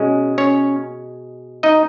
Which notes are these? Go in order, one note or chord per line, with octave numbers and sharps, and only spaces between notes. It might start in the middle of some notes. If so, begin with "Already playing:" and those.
Already playing: B2 G#3 C#4
C#4 C#5
D#4 D#5